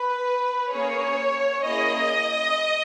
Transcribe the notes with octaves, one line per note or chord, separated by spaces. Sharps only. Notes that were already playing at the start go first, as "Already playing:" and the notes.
Already playing: B4
A#3 C#4 G#4 C#5
A#3 C#4 E4 G#4 D#5